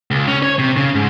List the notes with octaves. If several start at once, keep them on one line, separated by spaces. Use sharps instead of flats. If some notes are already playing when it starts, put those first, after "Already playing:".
C#2
C#4
C#5
C3
C#3
G#2